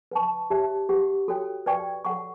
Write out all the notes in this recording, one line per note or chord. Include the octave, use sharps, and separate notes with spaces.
B4 F#5 A5 C#6
G4 C#5 E5 A5
G4 B4 F#5 C#6
F#4 A4 C#5 G5
B4 D5 G5 C#6
A4 C#5 F#5 C#6